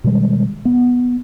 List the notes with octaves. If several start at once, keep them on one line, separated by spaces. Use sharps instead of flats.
B2 D#3 G3 G#3
B3